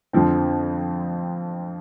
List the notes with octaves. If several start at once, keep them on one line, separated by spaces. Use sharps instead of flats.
F2 D3 F3 C4